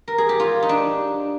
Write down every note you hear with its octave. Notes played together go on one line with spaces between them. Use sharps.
A#4
G#4
G4
F4
D#4
D4